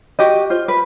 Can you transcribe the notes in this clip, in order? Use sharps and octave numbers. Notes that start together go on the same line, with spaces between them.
F#4 G4 D#5
F4 C5
B4